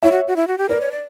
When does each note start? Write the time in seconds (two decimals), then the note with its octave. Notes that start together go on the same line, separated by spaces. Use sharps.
0.03 E4 C#5 E5
0.12 F#4
0.28 F#4
0.36 E4
0.48 F#4
0.58 G4
0.69 A#4 B4 D5
0.81 C#5
0.91 D5